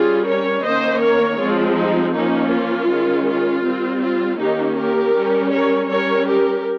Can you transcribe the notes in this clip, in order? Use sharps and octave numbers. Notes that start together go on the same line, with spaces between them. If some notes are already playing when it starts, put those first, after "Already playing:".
Already playing: G3 C#4 F4 G#4
A#4 C#5
D#3 A#3 C#4 C5 D#5
A#4 C#5
F3 G#3 C4 F4
D#4
F3 A#3 C#4 D#4
F4
D#3 G#3 C#4
F4
G3 C4
F4
D#3 A#3 C#4 D#4 G4
G4 A#4
G3 C#4
A#4 C#5
G3 C#4 A#4 C#5
G4 A#4